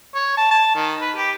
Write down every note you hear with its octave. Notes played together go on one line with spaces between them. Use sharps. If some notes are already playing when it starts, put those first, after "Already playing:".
C#5
A5
A5
D#3
B4
G4